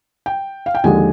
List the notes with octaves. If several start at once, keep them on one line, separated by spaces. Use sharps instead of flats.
G5
F5
G5
D#2 D3 F3 G#3 G#5